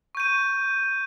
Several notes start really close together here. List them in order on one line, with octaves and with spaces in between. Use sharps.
C#6 G6 D#7